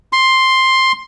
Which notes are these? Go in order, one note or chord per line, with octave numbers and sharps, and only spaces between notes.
C6